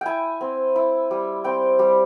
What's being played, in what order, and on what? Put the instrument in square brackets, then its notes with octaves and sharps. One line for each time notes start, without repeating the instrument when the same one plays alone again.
[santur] E4 G5 G#5
C4
E4
G3
C4 G5
G3